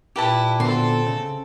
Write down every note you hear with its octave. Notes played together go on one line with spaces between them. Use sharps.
A#2 E4 G4 B4 A5
B2 D3 C4 A4 C6
C#3